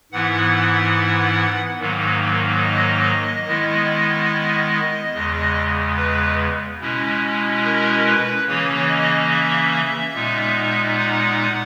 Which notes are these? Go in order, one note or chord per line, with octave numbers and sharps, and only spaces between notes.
G#2 E3 B3 E4 F#5
G#2 D#3 F#3 A#3
D#5
D#3 G#3 B3 E4
E2 C#3 G#3
B4
B2 G#3 C#4 E4
A#4
B4
C#3 E3 A#3 C#4 C#5
D#5
E5
A#2 G#3 B3 D#4
F#5